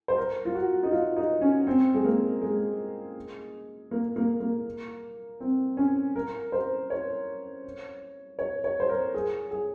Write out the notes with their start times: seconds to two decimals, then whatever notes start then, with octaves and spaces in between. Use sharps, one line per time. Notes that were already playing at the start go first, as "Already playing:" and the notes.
0.08 C5
0.18 A#4
0.45 F4
0.55 F#4
0.83 D#4
0.92 F4
1.16 D#4
1.41 C#4
1.67 C4
1.94 G#3
2.04 A#3
2.41 G#3
3.91 A#3
4.16 A#3
4.40 A#3
5.40 C4
5.77 C#4
6.16 A#4
6.52 C5
6.90 C#5
8.39 C#5
8.64 C#5
8.80 C5
8.89 A#4
9.15 G#4
9.51 G#4